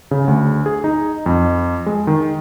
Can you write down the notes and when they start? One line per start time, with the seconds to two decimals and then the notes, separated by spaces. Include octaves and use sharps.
0.11 C#3
0.28 D2
0.66 G#4
0.84 D#4
1.26 F2
1.86 G#3
2.07 D#3